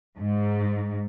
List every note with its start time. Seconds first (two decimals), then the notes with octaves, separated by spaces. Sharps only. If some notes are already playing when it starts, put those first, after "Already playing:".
0.18 G#2